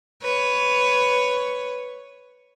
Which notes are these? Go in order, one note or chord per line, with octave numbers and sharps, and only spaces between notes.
B4 C#5